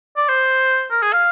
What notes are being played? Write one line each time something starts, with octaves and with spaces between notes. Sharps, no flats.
D5
C5
A#4
G#4
F5